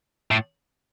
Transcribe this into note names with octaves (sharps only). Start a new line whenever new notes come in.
A2